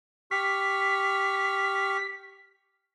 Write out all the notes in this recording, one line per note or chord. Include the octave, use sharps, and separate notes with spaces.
G4 C#6 F6 B6